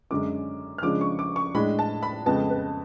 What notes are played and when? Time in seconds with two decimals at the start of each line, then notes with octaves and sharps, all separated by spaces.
0.11 F#2 D3 G#3 C#4 D6
0.78 F6
0.82 C#3 F3 G#3 D4 D6
1.01 C#6
1.19 D6
1.36 C#6
1.54 A2 G#3 D4 B5
1.79 A5
2.03 B5
2.26 F2 C#3 G#3 B3 A5
2.50 B4